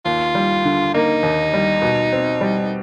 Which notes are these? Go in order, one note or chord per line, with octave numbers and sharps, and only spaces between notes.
D#2 F4
G3
D3
A#3 D#4
D#2
G3
B2
C4
G3